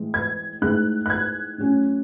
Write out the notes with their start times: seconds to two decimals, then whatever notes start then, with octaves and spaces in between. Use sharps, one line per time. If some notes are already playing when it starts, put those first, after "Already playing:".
Already playing: A2 E3 G#3
0.14 G#6
0.62 A2 G#3 D#4 G#4 F#6
1.06 F#6
1.10 G#6
1.58 A2 F#3 C#4